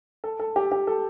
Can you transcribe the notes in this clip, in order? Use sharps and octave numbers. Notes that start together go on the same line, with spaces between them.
A4
A4
G4
G4
A4